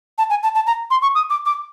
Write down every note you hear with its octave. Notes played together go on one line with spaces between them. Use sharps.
A5
G#5
A5
A5
A#5
C6
C#6
D#6
D6
D6